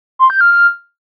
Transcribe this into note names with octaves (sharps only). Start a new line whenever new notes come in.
C6
G6
F6
F6